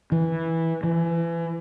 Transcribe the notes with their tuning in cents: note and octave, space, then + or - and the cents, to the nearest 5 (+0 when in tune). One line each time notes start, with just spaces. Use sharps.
E3 -10
E3 +30